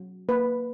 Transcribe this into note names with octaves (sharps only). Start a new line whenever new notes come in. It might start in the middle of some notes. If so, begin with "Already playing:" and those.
Already playing: F#3
A#3 B4